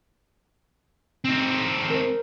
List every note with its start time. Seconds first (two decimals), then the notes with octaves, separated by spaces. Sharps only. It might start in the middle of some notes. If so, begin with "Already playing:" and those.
1.25 C4 D#4
1.90 A#4 C5